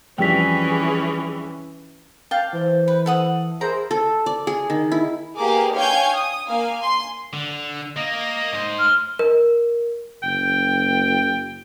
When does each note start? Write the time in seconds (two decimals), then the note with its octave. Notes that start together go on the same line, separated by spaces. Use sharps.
0.18 F2 E3 G3 C#4 G#4 G5 B6
2.31 F5 G5 A5 D6
2.53 E3 C5
2.88 B4
3.06 A4 F#5 D#6
3.61 E4 G#4 A#4 C5 A#5
3.91 A4
4.26 D5
4.47 G#4
4.70 D#3
4.92 E4
5.36 A#3 B3 G4 G#4 A#4 D6
5.74 C#5 F5 G5 G#5 G6 G#6
6.14 D#6
6.47 A#3 F5 G#5
6.79 G#5 C6
7.33 D3
7.97 A#3 D#5
8.53 G#2 C5
8.79 F6
9.19 A#4
10.23 F#1 G5